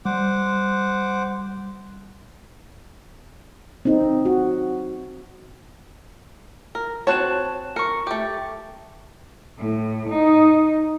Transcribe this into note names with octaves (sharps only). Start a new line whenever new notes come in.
G3 C5 F#5 D6
C4 D#4
F#4
A#4
C4 F#4 C#5 A5 F#6 E7
A#4 C#6 C#7
A3 G4
A2
D#4